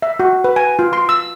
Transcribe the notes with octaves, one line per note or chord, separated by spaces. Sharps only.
E5
F#4
B4
G#5
F4
C6
E6